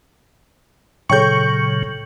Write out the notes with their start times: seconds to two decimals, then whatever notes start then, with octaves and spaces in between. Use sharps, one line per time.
1.10 A#2 C#3 F#3 A4 C#5 G5 C#6 G6